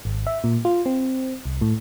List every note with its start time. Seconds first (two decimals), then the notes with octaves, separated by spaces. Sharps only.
0.05 G#1
0.27 E5
0.44 A#2
0.65 F4
0.86 C4
1.45 C2
1.61 A2